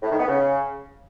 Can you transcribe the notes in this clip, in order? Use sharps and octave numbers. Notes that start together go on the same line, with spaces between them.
A2
D#3
B3
C#3